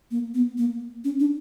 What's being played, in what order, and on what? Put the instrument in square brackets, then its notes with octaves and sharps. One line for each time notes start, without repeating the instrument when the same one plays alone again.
[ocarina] A#3
B3
A#3
C#4
D4